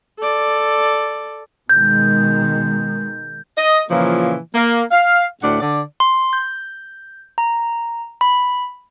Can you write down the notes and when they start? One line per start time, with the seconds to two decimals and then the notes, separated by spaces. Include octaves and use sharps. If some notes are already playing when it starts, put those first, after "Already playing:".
0.19 A4 D5
1.69 B2 D#3 G#3 G6
3.57 D#5
3.90 A#2 C#3 E3 F3 A#3
4.55 A#3
4.91 F5
5.43 D2 A2 D5 F#5
5.60 D3 D5
6.00 C6
6.33 G6
7.38 A#5
8.21 B5